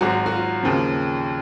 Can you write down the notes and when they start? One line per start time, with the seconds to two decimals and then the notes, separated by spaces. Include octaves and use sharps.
0.01 G#1 G#2 F#3 F#4
0.26 F#4
0.32 F4
0.63 D#2 C#3 F3